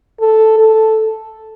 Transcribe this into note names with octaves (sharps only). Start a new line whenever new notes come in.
A4
A4